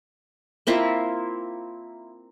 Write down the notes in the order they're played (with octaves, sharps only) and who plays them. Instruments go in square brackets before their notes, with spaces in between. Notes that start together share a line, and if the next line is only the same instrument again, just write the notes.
[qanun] A#3 C4 E4 F4